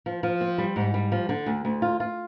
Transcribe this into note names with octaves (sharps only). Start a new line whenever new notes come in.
F3
F3
C4
G3
G#2
G3
F3
D3
D2
D2
F4
F4